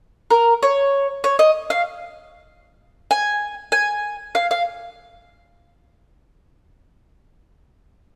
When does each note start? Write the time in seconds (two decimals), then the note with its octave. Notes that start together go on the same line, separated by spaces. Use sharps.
0.30 A#4
0.63 C#5
1.24 C#5
1.39 D#5
1.70 F5
3.11 G#5
3.72 G#5
4.35 F5
4.51 F5